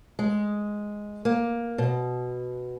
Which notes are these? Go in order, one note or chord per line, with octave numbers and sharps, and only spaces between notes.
G#3
A#3
B2